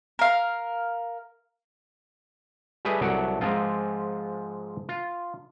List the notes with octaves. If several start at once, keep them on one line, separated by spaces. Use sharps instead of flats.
A#4 F5
G3 A3 G4 G#4 B4 D#5
C2 F#3 A3 A4 D5 F#5
G#2 F3 G#3 C4 F4
F4